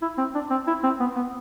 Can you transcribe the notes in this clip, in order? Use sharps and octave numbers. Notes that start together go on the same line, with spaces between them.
E4
C4
D4
C4
E4
C4
B3
B3